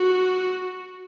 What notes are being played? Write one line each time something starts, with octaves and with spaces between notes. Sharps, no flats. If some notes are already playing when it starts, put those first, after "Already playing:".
Already playing: F#4